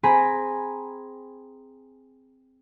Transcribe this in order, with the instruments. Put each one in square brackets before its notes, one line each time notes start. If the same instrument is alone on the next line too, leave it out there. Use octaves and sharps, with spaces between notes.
[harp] C4 G#4 G#5 A#5 B5